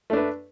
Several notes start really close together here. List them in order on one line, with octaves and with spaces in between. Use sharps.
A3 D4 B4